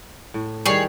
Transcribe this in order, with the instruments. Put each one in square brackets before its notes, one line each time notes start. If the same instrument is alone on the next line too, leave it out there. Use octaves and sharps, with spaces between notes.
[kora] A2
[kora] D#3 G3 [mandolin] G#4 C#5